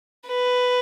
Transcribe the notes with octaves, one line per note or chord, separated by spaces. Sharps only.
B4